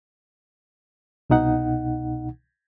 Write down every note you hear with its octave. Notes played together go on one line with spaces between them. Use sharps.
C2 B2 D#4 F#5